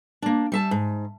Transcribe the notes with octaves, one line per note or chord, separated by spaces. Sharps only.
A#3 D4
G3 E5 A5
G#2